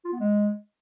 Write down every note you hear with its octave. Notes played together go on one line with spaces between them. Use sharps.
F4
B3
G#3